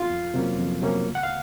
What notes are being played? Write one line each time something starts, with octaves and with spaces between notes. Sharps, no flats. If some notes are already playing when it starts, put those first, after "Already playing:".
Already playing: F4 F5
F2
C3 F#3 A#3 C#4
F2
C3 F#3 A#3 C#4
C#2
F#5
F5